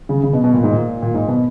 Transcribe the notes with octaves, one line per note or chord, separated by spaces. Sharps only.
C#3
C#3
B2
B2
A#2
G#2
A#2
A#2
G#2
B2